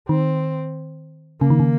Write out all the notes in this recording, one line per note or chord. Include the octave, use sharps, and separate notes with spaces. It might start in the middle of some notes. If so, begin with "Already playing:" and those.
D#3 C4
C#3 A#3
D#3
C#3